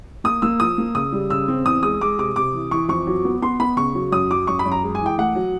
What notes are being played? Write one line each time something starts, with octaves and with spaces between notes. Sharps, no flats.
A#3 D#6
A#3 E6
F3 D#6
A#3
C#3 D#6
G3
C#3 E6
C4
E2 D#6
G#3 D#6
G#3 D6
C3 D6
C3 D6
E3
E3 C#6
F2 C#6
F#3
B3
B3 C6
B3 B5
C#3 C#6
F#3
F#2 D#6
F#3 D6
F#2 C#6
B5
F#2
A#5
G#3
G#5
E3
G5
A3 F#5
F#3